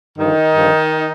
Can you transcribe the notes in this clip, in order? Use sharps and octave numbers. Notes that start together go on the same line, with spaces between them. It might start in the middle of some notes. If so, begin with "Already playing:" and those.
G2 D3 D#3 F3 D#4
G2 D3 F3